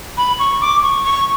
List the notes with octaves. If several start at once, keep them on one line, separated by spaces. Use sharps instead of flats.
B5
C#6
D6
C#6
C#6